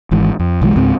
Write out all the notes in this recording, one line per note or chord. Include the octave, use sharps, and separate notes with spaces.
G#1 G#2 E3
F2
B1 E3 F#3 G#3
C#2 G#2 C4